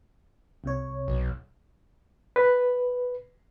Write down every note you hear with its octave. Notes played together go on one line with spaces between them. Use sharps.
C2 C3 C#5
B1
B4